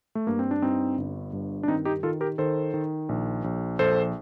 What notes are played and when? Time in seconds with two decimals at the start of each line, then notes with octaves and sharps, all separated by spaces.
0.15 A3
0.27 G2 A#3
0.39 C4
0.51 D4
0.62 G2 C4 D#4
0.98 G1
1.33 G2
1.63 D4
1.68 D#3 C4 D#4
1.85 D#4 G4
2.03 D#3 F4 A4
2.21 G4 A#4
2.38 D#3 A4 C5
2.74 D#3
3.09 A#1
3.44 A#1
3.79 A#1 A4 C5